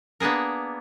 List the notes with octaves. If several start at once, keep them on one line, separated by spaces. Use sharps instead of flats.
A#3 B3 D4 G#4 A#4